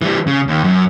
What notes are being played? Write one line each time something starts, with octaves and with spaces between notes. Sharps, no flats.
E3 G3
C#3
D#2
F#2